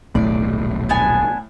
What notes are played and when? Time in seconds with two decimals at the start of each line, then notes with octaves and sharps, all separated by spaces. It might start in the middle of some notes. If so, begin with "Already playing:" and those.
0.15 D#1 B1 A2 D5
0.89 B3 D4 G#5